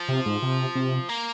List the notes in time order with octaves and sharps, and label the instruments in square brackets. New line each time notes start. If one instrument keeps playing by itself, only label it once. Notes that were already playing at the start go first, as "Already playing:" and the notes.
Already playing: [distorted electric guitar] F3
[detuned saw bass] C3
G#2
C3
C3
[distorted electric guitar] A#3